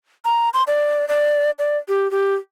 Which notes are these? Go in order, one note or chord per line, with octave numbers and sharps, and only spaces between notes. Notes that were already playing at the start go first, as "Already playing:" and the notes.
A#5
C6
D5
D5
D5
G4
G4